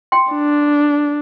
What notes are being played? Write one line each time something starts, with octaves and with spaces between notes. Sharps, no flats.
G5 C6
D4